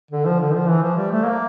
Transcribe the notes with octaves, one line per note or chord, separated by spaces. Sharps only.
D3
F3
D3
F3
E3
F3
G3
A3
A#3